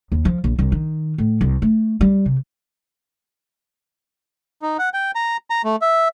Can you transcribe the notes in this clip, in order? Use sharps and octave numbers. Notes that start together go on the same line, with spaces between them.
D#2
F3
A#1
C2
D#3
A2
C2
A3
G3
C3
D#4
F#5
G5
A#5
A#5
A3
E5